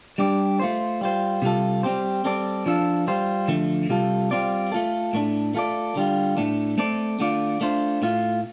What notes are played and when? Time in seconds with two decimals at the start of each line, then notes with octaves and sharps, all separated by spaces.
0.18 G3 D4 G4 D5
0.59 A3 F4 C5
1.01 G3 F4 C5
1.42 C3 G3 F4 A4
1.83 G3 C4 G4 C5
2.25 G3 C4 A4 D5
2.66 F3 D4 F4 A4
3.07 G3 F4 C5
3.48 D3 F3 A3
3.89 C3 G3 F4 A4
4.31 G3 C4 F4 D5
4.72 A3 F4 A4
5.13 A2 A3 D4
5.54 A3 F4 A4 D5
5.95 D3 G3 F4
6.37 A2 A3 D4
6.78 A3 C4 A4 D5
7.20 D3 A3 F4 D5
7.61 A3 D4 F4 C5
8.02 A2 A3 F4